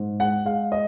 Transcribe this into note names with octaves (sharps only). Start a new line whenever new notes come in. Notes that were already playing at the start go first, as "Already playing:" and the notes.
Already playing: G#2
G#3 F#5
G#3 F5
D#5